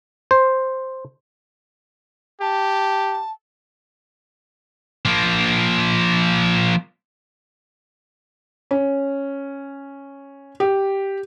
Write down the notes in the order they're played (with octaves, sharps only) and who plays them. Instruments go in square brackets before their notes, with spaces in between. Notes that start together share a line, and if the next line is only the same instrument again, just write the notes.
[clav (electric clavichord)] C5
[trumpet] G4 [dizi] A5
[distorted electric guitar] F3 A#3
[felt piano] C#4
G4